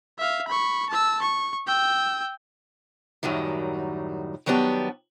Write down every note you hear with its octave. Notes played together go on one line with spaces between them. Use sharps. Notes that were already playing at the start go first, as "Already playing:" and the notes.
E5 F5
B5 C#6
A5 E6
C#6
G5 E6
F#2 A2 D#3 F#3 G3
D#3 F#3 G3 B3 D4 G4